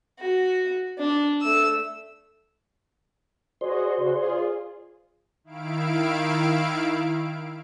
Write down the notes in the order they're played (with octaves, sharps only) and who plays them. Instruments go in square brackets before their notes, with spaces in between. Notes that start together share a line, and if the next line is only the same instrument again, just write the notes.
[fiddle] F#4
D4
A3 E6
[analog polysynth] F#4 G#4 D#5 [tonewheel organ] C5 D5 C6
[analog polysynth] C#3 F#4
F4 G#4
[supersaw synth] D#3 E4 F5 D7